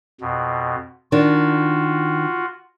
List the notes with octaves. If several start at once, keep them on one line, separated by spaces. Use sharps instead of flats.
F2 B2
D#3 D4 F4 F#4